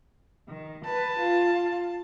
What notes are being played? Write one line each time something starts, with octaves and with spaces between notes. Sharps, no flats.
D#3
B4 A5
F4